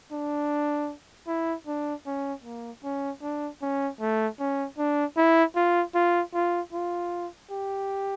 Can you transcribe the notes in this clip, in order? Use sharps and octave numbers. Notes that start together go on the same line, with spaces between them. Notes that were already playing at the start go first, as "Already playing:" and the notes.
D4
E4
D4
C#4
A#3
C#4
D4
C#4
A3
C#4
D4
E4
F4
F4
F4
F4
G4